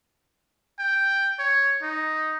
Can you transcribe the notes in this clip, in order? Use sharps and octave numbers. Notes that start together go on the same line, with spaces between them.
G5
C#5
D#4